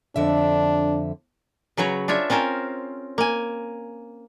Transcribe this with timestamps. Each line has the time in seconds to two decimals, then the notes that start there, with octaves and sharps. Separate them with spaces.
0.16 F2 D3 D4 E5
1.77 C#3 F#3 B4 C#5 A#5
2.08 D4 F4 C#5 E5
2.30 C4 C#4 F4 A#4 C5
3.18 A#3 G#5